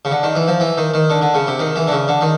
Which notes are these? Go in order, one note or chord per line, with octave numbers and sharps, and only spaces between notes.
C#3
D3
D#3
E3
F3
E3
D#3
D#3
D3
D3
C#3
C3
D#3
E3
D3
C#3
D3
D#3